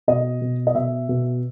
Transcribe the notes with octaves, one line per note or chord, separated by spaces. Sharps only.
B2 D#5
B2
D#5
B2 E5
B2